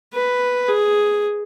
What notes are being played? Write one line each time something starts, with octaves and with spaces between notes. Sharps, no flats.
B4
G#4